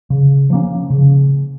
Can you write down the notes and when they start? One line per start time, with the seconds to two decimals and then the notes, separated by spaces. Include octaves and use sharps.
0.10 C#3
0.50 F3 A#3 C#4
0.90 C#3